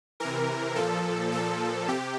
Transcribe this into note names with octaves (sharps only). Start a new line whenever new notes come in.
C3 E3 A#4
A#2 F3 A4
A#2 F3 A4
C3 G4